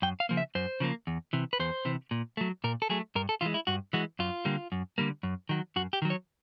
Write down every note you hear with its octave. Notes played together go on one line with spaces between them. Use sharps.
F#2 G5
F5
C#3 F3 A#3
E5
F#2 C5
C#3 F3 A#3
E2
C3 E3
B4
E2 C5
C3 E3
A#2
F#3 A3
A#2 A#4
A4
F#3 A3 G#4
G2 A#4
A4
E3 G#3 F4
E4
G2 F#4
E3 G#3 F#4
F#2 F4
D3 G3 A#3
F#2
D3 G3 A#3
F#2
D#3 F#3
F#2 F#4
G4
D#3 F#3
C#5